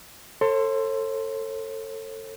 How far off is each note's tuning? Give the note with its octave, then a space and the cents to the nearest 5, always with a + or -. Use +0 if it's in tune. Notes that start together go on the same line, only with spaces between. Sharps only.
A4 +25 C#5 -45 C6 -10